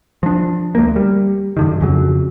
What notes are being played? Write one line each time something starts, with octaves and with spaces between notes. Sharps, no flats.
F3 D4
D2 A#3
G3
F#2 D3 D#3
F2 C#3 F#3